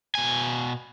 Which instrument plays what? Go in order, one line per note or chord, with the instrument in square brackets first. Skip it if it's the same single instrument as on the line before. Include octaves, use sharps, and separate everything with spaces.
[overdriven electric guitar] B2 G#5